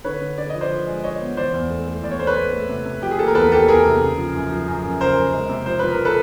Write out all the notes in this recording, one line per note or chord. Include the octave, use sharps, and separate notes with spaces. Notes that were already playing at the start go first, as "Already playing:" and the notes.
D3 B4 C#5
D3
D3 D5
F3 D#5
C5 D5
F3
G#3
G#3 C#5 D#5
B3
E3 C5 D5
E2
A3
A3
E2 D5
C#5
A3 C5
B4 C#5
A3
A3
C3
C3
F3 G4
G#4
A#3 A4
A#4
E2 A4 B4
A#3 G4 A4
E2 G#4 A#4
C3
C#3
F3
F#2
F3
F#2
F#2
C#3 A#4 C5
F#2
G#3
C3
F3 C5
F3 B4
A#4
F3
A4 B4